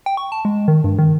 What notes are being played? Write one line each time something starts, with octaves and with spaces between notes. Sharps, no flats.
G5
C#6
A5
G#3
D#3
G2
D#3